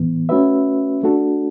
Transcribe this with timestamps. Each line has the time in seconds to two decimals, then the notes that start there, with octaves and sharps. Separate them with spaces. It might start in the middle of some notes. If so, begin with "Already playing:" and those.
Already playing: A2 E3 B3
0.29 A3 C#4 F#4 B4 E5
1.03 A3 D4 F#4 A4